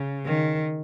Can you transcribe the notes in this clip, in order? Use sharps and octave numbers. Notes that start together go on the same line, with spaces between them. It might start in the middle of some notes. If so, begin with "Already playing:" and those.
Already playing: C#3
D#3